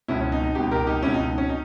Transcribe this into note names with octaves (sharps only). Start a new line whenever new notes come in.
C#2 B2 C#4 E4
C#4
D#4
D#4
C#2 B2 D#4 G4
G4 A#4
D#4 G4
C#2 B2 C#4 E4
D#4
C#4
D#4